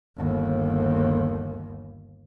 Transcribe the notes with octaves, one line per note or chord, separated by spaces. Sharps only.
G1 D#2